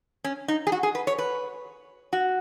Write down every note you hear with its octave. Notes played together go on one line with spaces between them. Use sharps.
C#4
D#4
G#4
F#4
G#4
B4
C#5
B4
F#4